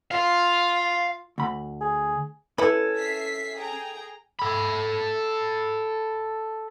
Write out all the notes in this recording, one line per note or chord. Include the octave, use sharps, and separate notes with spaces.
F4 F5
D2 B5
G#4
C#4 E4 A4 B4 G#5
E5 B6 C7
G#4 G5 A#5
A4 B5